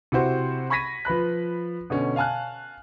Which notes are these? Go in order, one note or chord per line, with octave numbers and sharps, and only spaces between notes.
C3 E4 F#4 C5
B5 C#6 G#6 A#6 B6 D#7
F3 B4 B5 F#6
B2 D3 C#4
F5 G#5 A5 F6 F#6